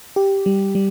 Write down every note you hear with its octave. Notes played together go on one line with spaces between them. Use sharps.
G4
G3
G3